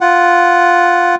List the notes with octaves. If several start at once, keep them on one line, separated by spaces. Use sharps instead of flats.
F4 F#5